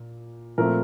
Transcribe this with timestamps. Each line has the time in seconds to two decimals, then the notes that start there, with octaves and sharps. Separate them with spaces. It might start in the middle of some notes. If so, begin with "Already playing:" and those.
Already playing: A#2
0.58 A#2 F3 A3 C4 A#4